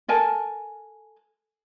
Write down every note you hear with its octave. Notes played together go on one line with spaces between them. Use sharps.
A4 A#4 G#5 A5